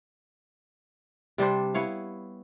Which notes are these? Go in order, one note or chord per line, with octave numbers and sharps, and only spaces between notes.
C3 G3 D4 C5
B3 E4 C#5 F5